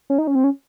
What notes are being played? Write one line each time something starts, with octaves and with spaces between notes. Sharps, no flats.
C#4
D#4
C#4
C4
C#4